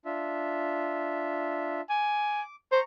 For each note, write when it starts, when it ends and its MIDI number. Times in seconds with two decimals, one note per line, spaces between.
0.05 1.81 62
0.05 1.81 65
0.05 1.81 76
1.90 2.42 80
1.90 2.56 86
2.72 2.80 72
2.72 2.83 82
2.72 2.83 85